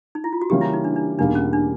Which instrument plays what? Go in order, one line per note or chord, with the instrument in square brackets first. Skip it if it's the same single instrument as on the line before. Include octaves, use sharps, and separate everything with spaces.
[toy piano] D#4
E4
F4
F#4
[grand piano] C#3 E3 G3 A#3 C#4 [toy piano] G4
[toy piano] E4
D#4
D4
D4
[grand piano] E2 B2 G3 A#3 D#4 [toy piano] D4
[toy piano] C#4
D4